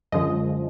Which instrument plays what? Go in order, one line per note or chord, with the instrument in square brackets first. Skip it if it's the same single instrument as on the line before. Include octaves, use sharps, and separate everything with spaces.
[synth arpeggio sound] F#2 D3 F3 G#3 D#5